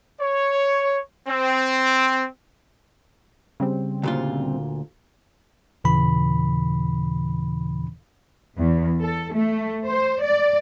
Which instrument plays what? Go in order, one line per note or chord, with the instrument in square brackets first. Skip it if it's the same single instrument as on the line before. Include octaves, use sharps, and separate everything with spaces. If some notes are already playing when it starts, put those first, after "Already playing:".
[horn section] C#5
C4
[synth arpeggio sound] C#3 G3 C4
[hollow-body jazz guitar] D2 A#2 F4
[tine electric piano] D#2 A#2 C#3 E3 B5
[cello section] E2
A4
A3
C5
D5